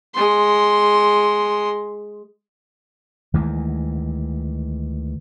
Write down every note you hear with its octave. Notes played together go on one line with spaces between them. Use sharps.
G#3 C6
D2 D#3 E3 G#3